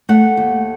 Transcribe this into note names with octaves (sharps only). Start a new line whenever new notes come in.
A3 F#5
D#2